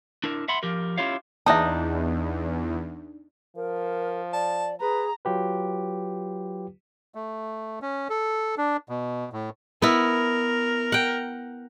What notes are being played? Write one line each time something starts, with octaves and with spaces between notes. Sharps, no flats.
D4 E4 A#4
E5 F#5 B5 C6
F3 G4 A#4
C#4 E4 F4 G4 C#5 F5
E2 D4 D#4 E5 A5
F3 A#4
D5 A5
G#4 B4 A#5
F#3 F4 G4 B4
A3
C#4
A4
D4
B2
A2
B3 E4 A#4
F#5 G5